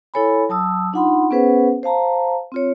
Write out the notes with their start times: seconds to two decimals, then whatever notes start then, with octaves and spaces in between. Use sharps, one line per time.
0.14 E4 A4 C#5 G#5 B5
0.49 F#3 A5 D#6 E6
0.93 D4 D#4 F4 F#5 B5 C6
1.31 B3 C#4 G#4 B4 C5 F#5
1.83 C5 F5 A5 A#5
2.52 C4 F4 C#5